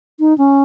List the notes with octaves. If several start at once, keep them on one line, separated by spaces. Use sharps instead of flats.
D#4
C#4